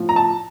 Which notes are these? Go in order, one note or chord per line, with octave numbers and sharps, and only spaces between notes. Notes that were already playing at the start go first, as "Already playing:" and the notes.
Already playing: A2 F3
A#5
A5